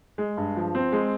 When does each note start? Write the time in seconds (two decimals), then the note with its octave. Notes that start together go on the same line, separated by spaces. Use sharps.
0.18 G#3
0.37 G2
0.56 F3
0.75 C4
0.92 G#3